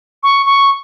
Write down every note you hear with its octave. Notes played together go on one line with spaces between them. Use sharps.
C#6
C#6